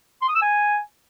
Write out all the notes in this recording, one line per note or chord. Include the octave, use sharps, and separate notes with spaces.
C6
D#6
E6
G#5